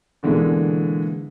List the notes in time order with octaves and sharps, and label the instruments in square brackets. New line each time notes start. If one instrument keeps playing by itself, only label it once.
[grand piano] B2 D3 E3 G#3 A#3